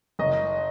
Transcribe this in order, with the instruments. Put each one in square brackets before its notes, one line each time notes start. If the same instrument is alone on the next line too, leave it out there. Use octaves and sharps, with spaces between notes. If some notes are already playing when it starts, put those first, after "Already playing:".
[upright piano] F#1 D#5